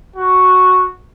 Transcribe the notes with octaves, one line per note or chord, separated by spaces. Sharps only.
F#4